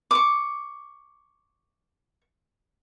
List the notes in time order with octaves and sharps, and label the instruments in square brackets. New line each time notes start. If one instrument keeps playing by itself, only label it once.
[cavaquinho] C#6 D6